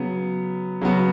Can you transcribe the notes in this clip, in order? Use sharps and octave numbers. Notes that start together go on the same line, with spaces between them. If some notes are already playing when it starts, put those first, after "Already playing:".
Already playing: C#3 F#3 B3
C#3 F#3 B3 F#4